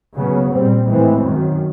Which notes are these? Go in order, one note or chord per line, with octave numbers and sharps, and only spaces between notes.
C#3 F#3 B3
A#2 G3 C4
A2 E3 G#3 C4
F#2 D#3 F#3